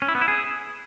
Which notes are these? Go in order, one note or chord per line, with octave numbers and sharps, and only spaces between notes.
C#4
E4
B3
E4
G#4